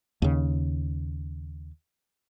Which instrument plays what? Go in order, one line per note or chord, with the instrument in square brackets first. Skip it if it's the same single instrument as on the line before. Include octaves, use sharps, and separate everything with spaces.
[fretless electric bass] D#2 C#3